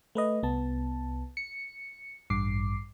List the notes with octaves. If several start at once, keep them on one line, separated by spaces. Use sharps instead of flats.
A3 B4 D#5
C2 B3 A5
C#7
A1 G2 D6 C7